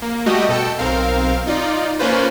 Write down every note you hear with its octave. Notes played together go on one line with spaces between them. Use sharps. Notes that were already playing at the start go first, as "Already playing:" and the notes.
A#3
G3 A3 F#4 G4 D#5
B2 A4 G5 C#7
B1 C4 A#4 F5
D#4 F4 D5
A#3 C#4 F4 B4 C5